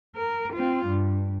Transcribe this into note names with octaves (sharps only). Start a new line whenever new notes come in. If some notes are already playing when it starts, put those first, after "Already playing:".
A#4
C4 F4
G2